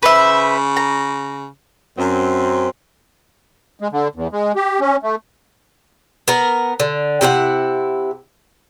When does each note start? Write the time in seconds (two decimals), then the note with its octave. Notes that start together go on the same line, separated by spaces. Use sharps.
0.03 C#3 B4 C5 E5
0.77 A#5
1.97 F#2 C4
3.80 G#3
3.92 D3
4.15 E2
4.32 G#3
4.56 G4
4.80 C#4
5.03 A3
6.28 B3 A#4
6.80 D3
7.21 C3 E4 G#4 F#5